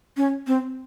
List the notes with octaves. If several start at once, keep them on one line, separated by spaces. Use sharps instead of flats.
C#4
C4